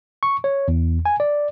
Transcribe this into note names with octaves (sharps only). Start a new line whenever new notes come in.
C#6
C#5
E2
G#5
D5